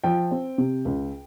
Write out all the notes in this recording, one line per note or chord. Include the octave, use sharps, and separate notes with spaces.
F3 G5
C4
C3
C#2